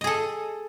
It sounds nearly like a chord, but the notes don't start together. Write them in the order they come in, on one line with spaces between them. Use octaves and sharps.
D#5 G#4 A4